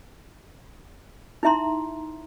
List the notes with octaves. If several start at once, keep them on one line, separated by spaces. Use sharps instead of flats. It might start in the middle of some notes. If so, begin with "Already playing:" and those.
D#4 E4 E5 A#5 C6